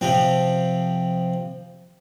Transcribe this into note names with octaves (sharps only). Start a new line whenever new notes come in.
C3 F3 C4